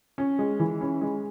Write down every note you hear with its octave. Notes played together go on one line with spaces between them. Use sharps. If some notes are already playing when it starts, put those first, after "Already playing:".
C#4
G#3
E3
C#4
G#3